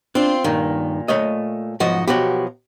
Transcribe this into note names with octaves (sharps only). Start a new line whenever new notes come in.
C4 D4 F4
G2 A#2 D#3
A3 C#5 D#5
B1 G#2 F3 F#4 D#5
B2 F3 F#3 F#4 G4